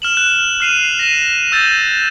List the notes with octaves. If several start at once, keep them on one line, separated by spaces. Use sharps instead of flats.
F6 E7 F#7
F#6
F6 C7 D#7 F7
A#6 D#7 E7
E6 G6 A6